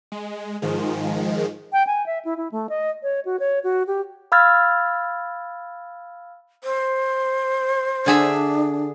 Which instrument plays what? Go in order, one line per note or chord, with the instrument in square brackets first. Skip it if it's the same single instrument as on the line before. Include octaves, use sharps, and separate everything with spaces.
[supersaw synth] G#3
G#2 D#3 F3 G#3
[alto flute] G5
G#5
E5
E4
E4
A3
D#5
C#5
F#4
C#5
F#4
G4
[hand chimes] F5 B5 E6 F6 G#6 A6
[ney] C5
[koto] D3 G#4 E5 [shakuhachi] D4